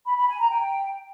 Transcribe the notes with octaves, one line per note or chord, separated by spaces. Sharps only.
B5
B5
G#5
A#5
G5